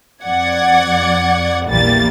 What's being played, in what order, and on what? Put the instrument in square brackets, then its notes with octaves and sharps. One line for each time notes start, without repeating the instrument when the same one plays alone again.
[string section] F2 D5 F#5 G#6
A#1 E2 E3 G3 A#3 A6